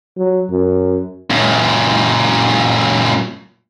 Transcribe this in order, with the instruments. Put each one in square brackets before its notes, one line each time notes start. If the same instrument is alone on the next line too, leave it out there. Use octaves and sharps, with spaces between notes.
[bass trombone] F#3
F#2
[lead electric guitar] F#2 A#2